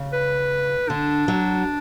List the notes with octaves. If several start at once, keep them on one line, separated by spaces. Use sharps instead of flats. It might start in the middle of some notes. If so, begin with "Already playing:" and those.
Already playing: C#3
B4
D3 D4
F#3